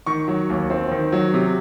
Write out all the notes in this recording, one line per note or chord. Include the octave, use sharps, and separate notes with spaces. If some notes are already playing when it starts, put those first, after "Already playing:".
D#3 C#6
F#3
D#2
C4
D#3
F#3
C3